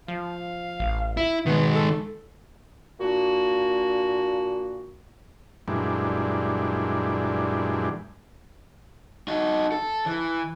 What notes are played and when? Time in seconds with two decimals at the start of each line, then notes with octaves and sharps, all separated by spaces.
0.08 F3 F5
0.80 A1
1.17 E4
1.46 B2 D#3 G#3 B3
1.75 A4
3.00 A#2 A#3 D4 F#4
5.68 F#2 A#2 E3 G3 G#3 D4
9.28 D#4 F#4
9.72 A4
10.06 E3